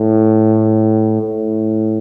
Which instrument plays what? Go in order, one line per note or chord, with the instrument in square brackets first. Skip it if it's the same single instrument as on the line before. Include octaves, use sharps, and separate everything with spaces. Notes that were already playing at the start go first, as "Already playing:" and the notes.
Already playing: [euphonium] A2
A2